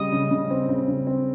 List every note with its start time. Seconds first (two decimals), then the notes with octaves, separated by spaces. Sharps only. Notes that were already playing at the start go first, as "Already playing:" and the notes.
Already playing: C#3 G3 D#5
0.12 C#3
0.31 C#3
0.50 C4
0.69 C#3
0.88 C#3
1.07 C4